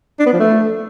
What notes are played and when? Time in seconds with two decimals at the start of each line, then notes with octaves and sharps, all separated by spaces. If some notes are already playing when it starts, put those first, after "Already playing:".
0.20 D4
0.26 B3
0.33 F3
0.40 A3